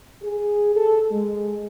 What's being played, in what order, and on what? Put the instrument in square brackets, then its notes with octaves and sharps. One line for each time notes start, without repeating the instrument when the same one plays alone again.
[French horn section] G#4
A4
G#3